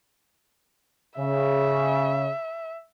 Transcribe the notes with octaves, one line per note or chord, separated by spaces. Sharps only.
C#3 E5